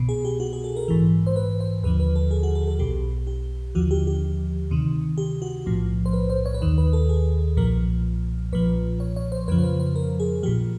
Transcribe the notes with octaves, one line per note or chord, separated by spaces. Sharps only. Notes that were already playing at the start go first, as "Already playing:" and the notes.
Already playing: C2 B2
G#4
G4
F#4
G#4
A4
A#4
A#1 G#2 E3
C5
B4
C5
D#2 D3 F3 B4
B4
A4
G#4
F#4
A4
A4
B1 B2 G4
G4
D#2 D3 F3 F#4
G4
G4
D2 C3 D#3
G4
F#4
B1 A2 F3
C5
B4
C5
C#5
B4
D#2 D#3 C5
B4
A4
G#4
B1 A#2 F3 A#4
B1 A#2 F3 B4
C#5
C#5
C5
F2 C#3 F3 B4
C5
B4
C5
A#4
G#4
A#1 A#2 F3 G4